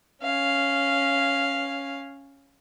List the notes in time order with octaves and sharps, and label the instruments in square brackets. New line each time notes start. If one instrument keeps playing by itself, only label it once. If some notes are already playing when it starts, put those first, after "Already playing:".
[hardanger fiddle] C#4 F5